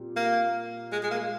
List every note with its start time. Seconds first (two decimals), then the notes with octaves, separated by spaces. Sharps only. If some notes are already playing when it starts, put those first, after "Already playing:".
Already playing: A#2 G3 C4
0.16 A#3
0.92 G#3
1.03 G#3
1.11 A#3